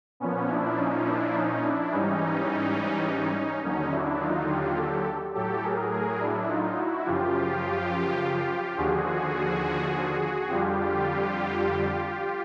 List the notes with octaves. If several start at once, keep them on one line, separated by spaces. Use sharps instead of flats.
A#2 F3 B3 C#4
D4 E4
C#4 D#4
D4 E4
C#4 D#4
D4 E4
G#2 E3 G3 C#4 D#4
D#2 D3 F#3 C#4 D#4
D4 E4
D#4 F4
F4 G4
G4 A4
A2 F#3 G4 A4
G#4 A#4
G#4 A#4
D4 E4
D#4 F4
E4 F#4
F#2 C#3 F3 F4 G4
D#2 D3 F3 F#4 G#4
F2 D3 G3 F4 G4